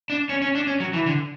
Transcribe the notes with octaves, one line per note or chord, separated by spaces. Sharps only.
D4
C#4
C#4
D4
C#4
F#3
E3
D3